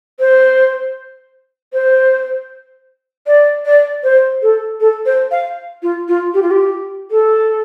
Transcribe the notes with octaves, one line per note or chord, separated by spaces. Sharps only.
C5
C5
D5
D5
C5
A4
A4
C5
F5
F4
F4
G4
F4
G4
A4